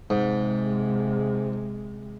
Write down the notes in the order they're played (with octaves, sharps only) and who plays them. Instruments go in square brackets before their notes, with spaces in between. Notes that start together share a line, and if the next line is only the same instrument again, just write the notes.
[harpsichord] G#2 [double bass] C3 G#3